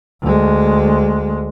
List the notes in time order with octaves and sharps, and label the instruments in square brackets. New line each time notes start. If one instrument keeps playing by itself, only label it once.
[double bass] D2 G#3